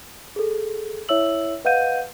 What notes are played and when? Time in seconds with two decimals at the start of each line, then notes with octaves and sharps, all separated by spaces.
0.36 G#4 A4
1.09 E4 C#5 E5 E6 F#7
1.65 B4 D#5 F5 F#5 G6 D#7